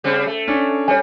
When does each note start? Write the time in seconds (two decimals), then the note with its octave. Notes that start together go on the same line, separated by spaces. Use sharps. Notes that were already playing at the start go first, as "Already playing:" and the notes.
0.04 C#3 G3 C4
0.27 A3
0.48 C#4 D4
0.88 G3 C#5 G#5